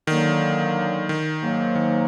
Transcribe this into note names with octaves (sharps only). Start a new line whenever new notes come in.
D3 D#3 F#3 A#3
D#3
G#2 F#3 A#3
D#3